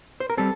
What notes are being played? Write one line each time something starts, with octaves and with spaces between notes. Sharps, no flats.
C5
A#4
G3 C4 A4